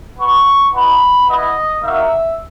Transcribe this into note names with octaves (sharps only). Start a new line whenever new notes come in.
B3 F#4 C#6
B3 D#4 F#4 B5
B3 E4 D#5
A#3 D#4 F#4 E5